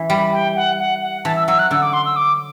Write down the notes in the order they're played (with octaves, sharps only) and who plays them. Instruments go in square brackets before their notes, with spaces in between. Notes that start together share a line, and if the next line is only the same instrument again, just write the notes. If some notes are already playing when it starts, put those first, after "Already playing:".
Already playing: [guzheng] E3
[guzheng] G3 [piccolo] B5
[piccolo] G5
F#5
F#5
F#5
[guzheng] E3 [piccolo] A5
[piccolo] E6
[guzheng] F#3 [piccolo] E6
[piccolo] F#6
[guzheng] D3 [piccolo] E6
[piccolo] D6
C6
E6
D6